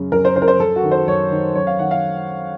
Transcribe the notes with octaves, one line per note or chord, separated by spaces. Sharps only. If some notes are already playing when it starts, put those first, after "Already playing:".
Already playing: F#2 C#3
F#2 A#4
C5
C#3 C5
A#4
C5
F#2 A4
F#4
D#3
C5
F#2 C#5
D#3
F#2 C#5
F5
D#3 F#5
F5